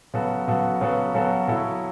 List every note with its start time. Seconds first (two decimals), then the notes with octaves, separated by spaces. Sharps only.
0.14 C#3 F#3 B3 F#4 A4
0.48 C#3 F#3 B3 F#4 A4
0.81 C#3 F#3 B3 F#4 A4
1.14 C#3 F#3 B3 F#4 A4
1.48 C#3 F#3 C#4 E4 A4